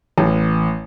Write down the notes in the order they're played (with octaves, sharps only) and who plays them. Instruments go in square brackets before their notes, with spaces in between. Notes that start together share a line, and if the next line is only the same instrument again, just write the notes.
[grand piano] A1